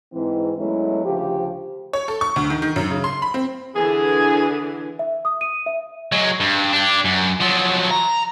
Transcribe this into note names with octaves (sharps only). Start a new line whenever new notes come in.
G#2 E3 C4
E2 F#3 G#3 A3 C#4 E4
D2 C#3 F3 G4
C#5
A4
C#6
D2
D#3
D#3
F#2
C#3
C6
B5
C4
D3 E3 G#4
E5
D#6
D#7
E5
F#3 G#3
G2
D4 G4
F#2
F3 F#3
A#5